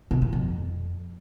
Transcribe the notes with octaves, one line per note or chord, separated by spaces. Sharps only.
B2
A#2
F2